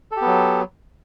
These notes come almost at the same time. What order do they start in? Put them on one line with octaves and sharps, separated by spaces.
A4 G4 B3 F#3